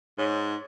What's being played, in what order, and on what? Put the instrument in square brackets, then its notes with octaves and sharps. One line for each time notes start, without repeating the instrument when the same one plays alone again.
[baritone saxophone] G#2 [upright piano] C#5